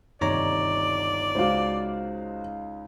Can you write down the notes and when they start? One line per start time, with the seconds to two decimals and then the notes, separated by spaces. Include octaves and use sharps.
0.21 G1 D#2 C3 D#4 C#5 D5 A#5
1.35 C#2 G#3 F#4 C5 F5